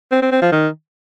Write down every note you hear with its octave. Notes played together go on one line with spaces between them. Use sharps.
C4
C4
C4
F3
D#3